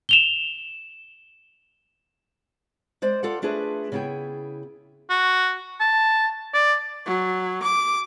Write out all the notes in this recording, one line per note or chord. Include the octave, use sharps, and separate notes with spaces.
E7 F7 G7
G#3 C5 D5
F4 A4 D5 F#5
A3 D4 F4 G#4 B4 E5
C#3 B3 E4 G#4 G5
F#4
A5
D5
F#3
D6